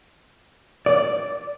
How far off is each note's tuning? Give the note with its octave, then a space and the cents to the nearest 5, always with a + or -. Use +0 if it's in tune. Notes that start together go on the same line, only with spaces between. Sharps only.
D5 -5